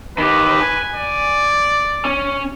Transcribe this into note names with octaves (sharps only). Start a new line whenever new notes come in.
D#3 G4 B4
G#5
D5
C#4